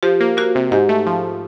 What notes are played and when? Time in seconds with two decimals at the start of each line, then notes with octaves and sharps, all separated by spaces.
0.03 F3 G4
0.20 A#3
0.37 A#3 F#4
0.55 C3
0.71 G#2 G4
0.89 A3
1.06 F3